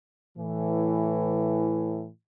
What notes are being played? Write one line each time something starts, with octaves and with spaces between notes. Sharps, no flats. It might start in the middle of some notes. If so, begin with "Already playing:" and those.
A2 E3